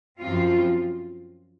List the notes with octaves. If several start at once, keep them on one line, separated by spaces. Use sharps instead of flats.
F#2 F3 C4 F4